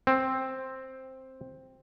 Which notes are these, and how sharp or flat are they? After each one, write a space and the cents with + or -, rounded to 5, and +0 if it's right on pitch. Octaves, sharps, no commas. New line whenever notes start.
C4 +5